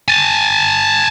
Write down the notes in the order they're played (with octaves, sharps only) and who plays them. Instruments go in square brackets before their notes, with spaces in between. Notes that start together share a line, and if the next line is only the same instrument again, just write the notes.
[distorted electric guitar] G#5 A5